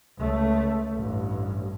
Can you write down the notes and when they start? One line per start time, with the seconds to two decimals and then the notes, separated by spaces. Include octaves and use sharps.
0.17 C#2 A3
0.96 A1 G2